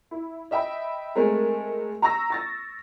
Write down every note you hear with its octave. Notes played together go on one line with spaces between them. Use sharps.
E4
D#5 E5 G5 B5
G#3 A3 C4 A#4
A#5 C#6 E6 A#6
C#6 A6 A#6